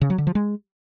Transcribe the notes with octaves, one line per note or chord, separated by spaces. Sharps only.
C#3
F#3
D3
F3
G#3